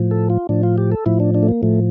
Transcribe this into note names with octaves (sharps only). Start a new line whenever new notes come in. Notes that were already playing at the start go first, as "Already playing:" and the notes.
Already playing: A2 F3
A4
F4
A2 F3 D4
F4
G4
A4
A2 F3 E4
D4
D4
A3
A#3
A2 F3 A3